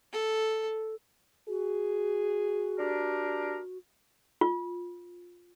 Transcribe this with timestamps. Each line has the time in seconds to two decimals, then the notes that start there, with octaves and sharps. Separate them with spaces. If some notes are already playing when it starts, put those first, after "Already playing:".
0.13 A4
1.48 F#4 G#4
2.79 D4 G4 A#4
4.41 F4